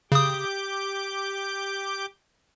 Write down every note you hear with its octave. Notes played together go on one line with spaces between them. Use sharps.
C#3 G4 D6 D#6 G6